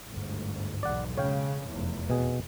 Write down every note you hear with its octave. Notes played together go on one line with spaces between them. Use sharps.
G1 D2 G#2
B1 E2 D5 F#5
C#3 G#3 C#5 F5 G5
F1 E2
B2 G#4